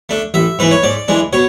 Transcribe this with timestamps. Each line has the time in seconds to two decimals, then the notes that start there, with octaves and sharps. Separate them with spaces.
0.09 A3 D4
0.34 A1 E5
0.59 G#2 E3 B4
0.71 C#5
0.83 G#2 D5
1.08 E3 G#3 D4
1.33 B2 C#5